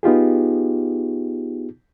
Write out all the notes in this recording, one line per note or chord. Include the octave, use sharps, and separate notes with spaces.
B3 D#4 F4 G4 G#4